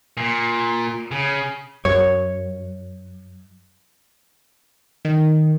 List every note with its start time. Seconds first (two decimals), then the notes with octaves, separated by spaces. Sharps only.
0.17 A#2
1.11 C#3
1.85 F#2 C#5
5.05 D#3